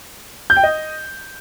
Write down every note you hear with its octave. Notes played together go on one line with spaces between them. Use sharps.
G6
G5
D#5